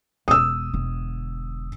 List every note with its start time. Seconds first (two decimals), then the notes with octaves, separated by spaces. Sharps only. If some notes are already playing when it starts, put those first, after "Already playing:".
0.28 E1 D#6 E6
0.73 E1 D3